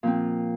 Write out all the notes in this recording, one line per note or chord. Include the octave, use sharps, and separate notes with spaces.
A#2 F3 C4